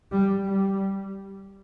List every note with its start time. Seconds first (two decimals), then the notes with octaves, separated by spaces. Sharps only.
0.11 G3
0.46 G3